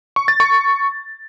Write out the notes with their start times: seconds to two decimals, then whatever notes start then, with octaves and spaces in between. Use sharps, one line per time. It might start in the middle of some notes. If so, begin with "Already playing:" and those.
0.16 C#6
0.28 A6
0.40 C#6